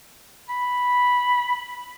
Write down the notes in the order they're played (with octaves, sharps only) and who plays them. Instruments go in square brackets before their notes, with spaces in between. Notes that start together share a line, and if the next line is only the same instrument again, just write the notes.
[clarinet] B5